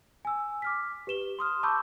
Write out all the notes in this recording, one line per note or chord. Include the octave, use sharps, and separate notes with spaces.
G#5 E6
D6 F6 B6
G4 B4 E7 G7
C6 D#6 F6
A5 B5 C#6 D6 E6 G6